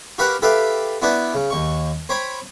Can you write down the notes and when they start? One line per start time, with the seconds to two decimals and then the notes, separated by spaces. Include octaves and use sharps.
0.18 F#4 G4 A#4 B4 F5 F#5
0.42 G4 A4 B4 E5 F5 G5
1.02 B3 D4 E4 F#4 B4
1.34 C#3
1.50 D#2 C#6
2.09 C5 C#5 G5 B5